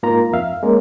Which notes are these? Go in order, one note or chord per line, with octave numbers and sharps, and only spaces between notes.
G#2 A#3 D#4 F4 A#4 A#5
F2 E5 F5
G#3 A#3 C#4 A#4